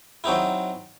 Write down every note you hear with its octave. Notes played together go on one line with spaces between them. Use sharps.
F#3 C4 D#4 E4